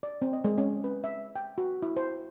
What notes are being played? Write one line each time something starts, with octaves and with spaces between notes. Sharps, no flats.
D5
C4
D#5
G#3
C#4
B4
E5
G5
F#4
E4
C5